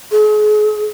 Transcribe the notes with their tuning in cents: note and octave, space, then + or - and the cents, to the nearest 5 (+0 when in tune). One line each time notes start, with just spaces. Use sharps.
G#4 +40